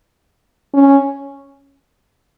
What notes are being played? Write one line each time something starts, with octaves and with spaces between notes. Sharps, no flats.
C#4